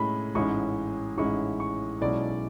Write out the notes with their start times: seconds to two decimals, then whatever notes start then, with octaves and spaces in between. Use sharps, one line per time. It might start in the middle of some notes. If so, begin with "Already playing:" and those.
Already playing: A2 G#3 C#4 E4 B5
0.34 A1 G#2 G#3 C#4 E4 C#6
1.17 A1 G#2 G#3 C#4 E4 C#6
1.60 C#6
2.01 B1 B2 G#3 C#4 E4 D5